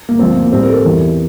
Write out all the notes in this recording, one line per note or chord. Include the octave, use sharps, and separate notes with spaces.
A#3
D2 D3 F3 C4
A#3
A2 G3 C4
A#4
A4
A#4
E2 E3 G3